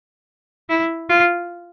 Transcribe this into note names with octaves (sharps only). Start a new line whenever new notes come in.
E4
F4